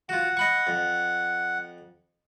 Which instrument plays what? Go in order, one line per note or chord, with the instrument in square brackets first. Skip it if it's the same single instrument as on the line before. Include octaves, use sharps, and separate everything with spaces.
[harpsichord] F4 F#4 [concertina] F#5
[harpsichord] D#5 B5 C#6
F2